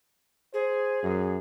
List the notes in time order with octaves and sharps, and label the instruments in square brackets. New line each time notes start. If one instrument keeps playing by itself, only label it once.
[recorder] G#4 [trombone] C5
[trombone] F#2